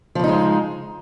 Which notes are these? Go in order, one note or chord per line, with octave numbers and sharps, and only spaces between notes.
C#3 F3 G#3 D#4